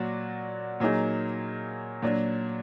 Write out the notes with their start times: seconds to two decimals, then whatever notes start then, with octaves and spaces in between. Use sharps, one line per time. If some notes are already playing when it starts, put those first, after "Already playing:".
Already playing: A#2 F#3 F#4 D5
0.80 A#2 F#3 A#3 D#4 G#4
2.02 A#2 F#3 D4